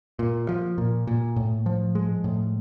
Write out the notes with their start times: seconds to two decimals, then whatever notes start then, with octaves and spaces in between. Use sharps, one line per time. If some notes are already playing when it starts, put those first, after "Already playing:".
0.19 A#2
0.49 F3
0.78 A#2
1.07 A#2
1.36 A2
1.66 F3
1.95 G#3
2.24 A2